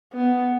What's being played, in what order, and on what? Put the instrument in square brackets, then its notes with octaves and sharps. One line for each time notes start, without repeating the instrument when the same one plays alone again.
[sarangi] B3